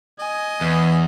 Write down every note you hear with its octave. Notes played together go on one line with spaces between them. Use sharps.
D#5 G#5
E2 E3